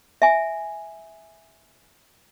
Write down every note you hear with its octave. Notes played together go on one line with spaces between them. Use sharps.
E5 G#5